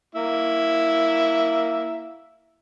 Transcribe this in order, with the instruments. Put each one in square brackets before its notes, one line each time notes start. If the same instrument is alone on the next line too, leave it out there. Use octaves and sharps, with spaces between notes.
[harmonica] A#3 E4